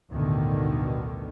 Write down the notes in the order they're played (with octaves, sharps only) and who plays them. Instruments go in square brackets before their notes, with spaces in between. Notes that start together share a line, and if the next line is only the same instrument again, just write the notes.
[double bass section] A1 D2 G2 B2 D3 D#3